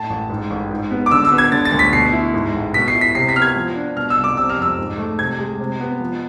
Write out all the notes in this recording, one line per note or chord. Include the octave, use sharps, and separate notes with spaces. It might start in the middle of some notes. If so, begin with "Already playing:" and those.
Already playing: A2 A5
A1
G#2
A1
G#2
B3
D6
D3 E6
E6
B3
G#6
D3 A6
A6
D2
B6
B2 C7
E4
G#2
A1
B2 B6
C7
E4
B6
C3 C7
B6
B3 F6
G#6
F3
D4
B2 F6
E6
C2
D6
C3 E6
F6
F2 E6
G#2
A3
C3 G#6
G#3
C3
B3
F3